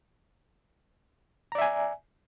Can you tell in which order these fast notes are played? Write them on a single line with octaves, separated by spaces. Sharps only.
A#5 D5 E5 G#5